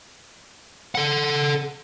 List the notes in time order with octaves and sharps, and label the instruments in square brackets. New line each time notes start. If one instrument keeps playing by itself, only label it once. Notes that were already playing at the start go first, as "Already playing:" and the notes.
[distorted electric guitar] A4 F#5